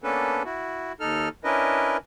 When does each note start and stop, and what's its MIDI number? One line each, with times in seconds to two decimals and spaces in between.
0.03 0.43 58
0.03 0.43 59
0.03 0.43 61
0.03 0.43 62
0.03 0.43 69
0.03 0.43 71
0.45 0.92 64
0.45 0.92 66
1.00 1.29 39
1.00 1.29 63
1.00 1.29 69
1.00 1.29 89
1.44 1.97 61
1.44 1.97 62
1.44 1.97 64
1.44 1.97 70
1.44 1.97 71
1.44 1.97 75